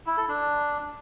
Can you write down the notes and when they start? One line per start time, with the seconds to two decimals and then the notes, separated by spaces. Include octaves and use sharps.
0.07 E4
0.18 A4
0.28 D4